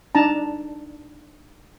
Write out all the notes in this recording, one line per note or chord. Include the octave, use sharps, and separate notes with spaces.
D4 D#4 A5 A#5